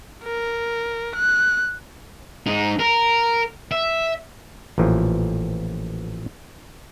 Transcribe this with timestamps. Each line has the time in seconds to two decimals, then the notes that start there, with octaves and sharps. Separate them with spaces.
0.24 A#4
1.15 F#6
2.47 G#2 D#4
2.79 A#4
3.72 E5
4.78 A1 A#2 E3 F3